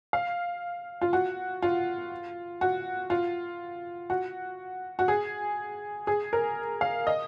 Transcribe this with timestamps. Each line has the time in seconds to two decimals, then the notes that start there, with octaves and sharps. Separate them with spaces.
0.13 F5
1.02 F4
1.13 F#4
1.63 F4
2.61 F#4
3.10 F4
4.10 F#4
4.99 F#4
5.08 G#4
6.07 G#4
6.33 A#4
6.81 F5
7.07 D#5